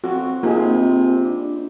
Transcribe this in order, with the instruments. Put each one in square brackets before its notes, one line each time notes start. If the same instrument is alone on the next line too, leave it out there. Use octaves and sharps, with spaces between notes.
[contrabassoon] F2 [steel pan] F#4
[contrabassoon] C3 [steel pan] A#3 D#4 G#4 [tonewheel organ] C4 [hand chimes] F4
[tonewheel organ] D4